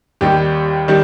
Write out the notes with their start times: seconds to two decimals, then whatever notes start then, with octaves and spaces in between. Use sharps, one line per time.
0.21 D#2 D#3 G3 G4
0.88 D#3 G3